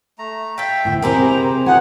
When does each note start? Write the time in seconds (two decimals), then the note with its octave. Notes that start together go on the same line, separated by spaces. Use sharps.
0.19 A3 A#5
0.58 F4 A4 E5 G5
0.85 D2 A2
1.02 C3 C4 E4 G4 G#4 A#4 C5 A#5
1.66 B3 D#4 F#4 F#5 G#5